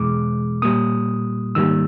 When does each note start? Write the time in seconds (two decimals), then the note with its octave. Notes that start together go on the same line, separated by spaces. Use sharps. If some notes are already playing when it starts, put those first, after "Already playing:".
Already playing: E2 B2 G#3 D6
0.62 A#2 G3 A#3 D#6
1.55 G#2 D#3 G3 A#3 E6